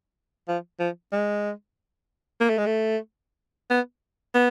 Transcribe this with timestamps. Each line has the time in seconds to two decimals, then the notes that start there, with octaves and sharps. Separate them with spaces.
0.48 F3
0.80 F3
1.12 G#3
2.40 A#3
2.50 A3
2.58 G#3
2.66 A3
3.70 B3
4.34 B3